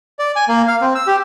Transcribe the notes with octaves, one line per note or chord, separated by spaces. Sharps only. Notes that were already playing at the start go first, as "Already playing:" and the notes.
D5
G#5
A#3
F5
C4
E6
G4